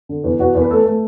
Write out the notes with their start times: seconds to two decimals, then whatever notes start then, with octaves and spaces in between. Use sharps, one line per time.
0.09 D3
0.24 E2
0.39 E2 F#4
0.55 E2
0.62 B4
0.70 A3 A4
0.85 A3